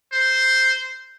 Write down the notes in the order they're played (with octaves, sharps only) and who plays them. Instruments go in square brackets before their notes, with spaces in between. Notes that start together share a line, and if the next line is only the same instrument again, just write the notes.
[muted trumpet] C5